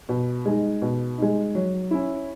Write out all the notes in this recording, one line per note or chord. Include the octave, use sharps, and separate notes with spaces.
B2
G#3 D#4
B2
G#3 D#4
F#3
C#4 E4